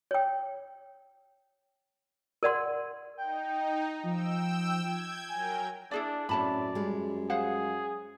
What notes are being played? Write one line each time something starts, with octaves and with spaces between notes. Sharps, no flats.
C#5 G5
A#4 D5 F#5 C6
D#4 G5
F3 G5 E6
G6 G#6
F#3 A#4 G5 G#5
D4 E4 G#4 D5
F#2 A2 C4 C#4 D5 A5 B5
G3 G#3
G#4 C5 F5 F#5